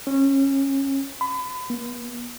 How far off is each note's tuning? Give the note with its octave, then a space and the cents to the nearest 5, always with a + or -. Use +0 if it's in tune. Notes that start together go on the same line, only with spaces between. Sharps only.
C#4 -20
B5 +35
B3 -45